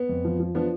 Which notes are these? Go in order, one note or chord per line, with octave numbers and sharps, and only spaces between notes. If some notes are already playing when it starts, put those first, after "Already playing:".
Already playing: B3
F2
F3
F3
F3 B3 D4